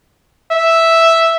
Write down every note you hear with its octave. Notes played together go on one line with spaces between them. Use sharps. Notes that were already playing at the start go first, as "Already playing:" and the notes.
E5